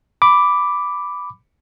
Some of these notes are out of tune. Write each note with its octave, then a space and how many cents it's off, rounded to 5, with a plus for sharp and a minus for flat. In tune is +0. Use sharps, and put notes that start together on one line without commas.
B5 +5 D6 +0